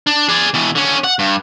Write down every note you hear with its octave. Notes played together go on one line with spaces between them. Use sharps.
D4
G#4 D5
B2 E3
D3 C#4
F#5
G2